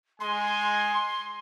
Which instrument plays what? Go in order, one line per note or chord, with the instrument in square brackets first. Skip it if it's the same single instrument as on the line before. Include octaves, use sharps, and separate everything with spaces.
[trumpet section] G#3 G#5 [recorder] C6